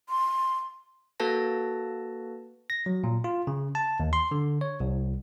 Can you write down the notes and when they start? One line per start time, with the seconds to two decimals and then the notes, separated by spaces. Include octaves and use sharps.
0.09 C6
1.20 A#3 F#4 A4 B4 A5 A#6
2.70 A#6
2.86 F#3
3.04 A#2
3.24 F4
3.47 C#3
3.75 A5
4.00 D#2
4.13 C6
4.31 D3
4.61 C#5
4.80 C2